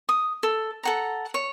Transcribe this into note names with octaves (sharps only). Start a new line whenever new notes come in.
D#6
A4
A4 F#5 A#5
C#5